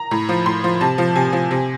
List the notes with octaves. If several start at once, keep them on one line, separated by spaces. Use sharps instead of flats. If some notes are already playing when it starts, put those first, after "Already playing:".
Already playing: A#5
A2
F3
A2 C6
F3
C3 A5
F3
C3 G#5
F3
C3